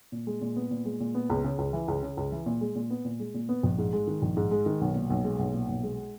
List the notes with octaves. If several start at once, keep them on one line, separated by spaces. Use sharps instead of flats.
A#2
G#3
A#2
B3
A#2
G#3
A#2
B3
C#2
C#3
C#2
E3
C#2
C#3
C#2
E3
A#2
G#3
A#2
B3
A#2
G#3
A#2
B3
A#1
G#2
G#3
D#3
A#1
G#2
G#3
D#3
B1
A#2
B1
G#3
B1
A#2
B1
G#3